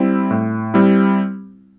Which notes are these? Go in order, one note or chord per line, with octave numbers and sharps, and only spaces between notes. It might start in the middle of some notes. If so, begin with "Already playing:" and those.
Already playing: G3 C4 E4
A2
G3 C4 E4